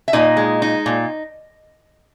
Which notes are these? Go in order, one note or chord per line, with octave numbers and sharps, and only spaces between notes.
E5
A#2 D#4 D#5
G#3
D#4
A#2